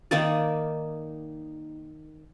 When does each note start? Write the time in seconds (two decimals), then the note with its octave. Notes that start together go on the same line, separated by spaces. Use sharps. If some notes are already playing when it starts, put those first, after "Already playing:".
0.11 D#3 A#3 D#4 D5